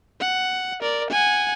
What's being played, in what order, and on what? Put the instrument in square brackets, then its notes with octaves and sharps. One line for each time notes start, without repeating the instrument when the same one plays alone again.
[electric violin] F#5
A#4 D5
F#5 G#5